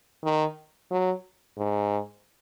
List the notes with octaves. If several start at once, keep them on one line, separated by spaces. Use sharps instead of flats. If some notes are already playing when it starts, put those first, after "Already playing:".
D#3
F#3
G#2